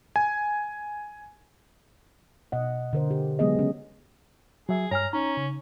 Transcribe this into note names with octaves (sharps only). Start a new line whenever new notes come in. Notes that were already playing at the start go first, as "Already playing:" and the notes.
G#5
B2 D#5 F#5
D3 A#4 C5
G4
C3 F#3 G#3 B3 G#4 D#5
C#3 C#4
F#3 G#4 E5
G2 C#5 G#5 A#5 F6
C#4 D#4 A#5
C#3